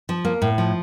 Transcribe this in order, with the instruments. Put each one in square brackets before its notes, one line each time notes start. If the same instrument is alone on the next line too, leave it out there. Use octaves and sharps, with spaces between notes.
[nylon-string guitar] F3
A#3
A2
F3